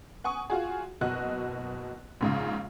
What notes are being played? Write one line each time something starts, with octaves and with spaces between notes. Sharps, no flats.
F#5 G#5 C#6 D#6
F4 F#4 G#4
F#1 B2 F#4 D#5 F#6
A#1 G#2 C#3